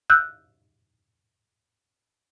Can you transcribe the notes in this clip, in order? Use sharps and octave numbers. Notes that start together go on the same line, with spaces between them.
E6 F#6 G6